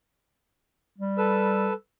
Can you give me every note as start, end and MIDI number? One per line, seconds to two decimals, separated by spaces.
0.98 1.72 55
1.18 1.73 69
1.18 1.73 71
1.18 1.73 88